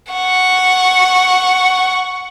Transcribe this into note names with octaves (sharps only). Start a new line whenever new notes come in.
F#5 C#6